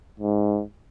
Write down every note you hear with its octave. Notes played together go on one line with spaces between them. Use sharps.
G#2